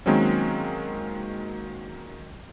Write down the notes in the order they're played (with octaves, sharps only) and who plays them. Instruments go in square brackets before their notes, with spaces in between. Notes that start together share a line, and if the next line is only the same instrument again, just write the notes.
[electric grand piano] D#3 F#3 G#3 A#3 C4 C#4